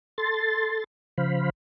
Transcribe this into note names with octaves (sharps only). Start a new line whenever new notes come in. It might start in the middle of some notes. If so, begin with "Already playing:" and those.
A4 C6 A6
C#3 F3 C5 F5 B5